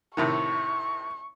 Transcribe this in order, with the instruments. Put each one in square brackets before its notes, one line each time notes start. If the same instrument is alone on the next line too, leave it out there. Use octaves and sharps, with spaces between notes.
[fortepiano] A2 C3 D#3 [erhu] C#6